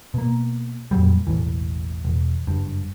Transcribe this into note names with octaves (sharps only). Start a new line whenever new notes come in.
B2 A#3
F2 A#2 F#3 G3
E1 A1 D#2 E3
E1
F#1 G2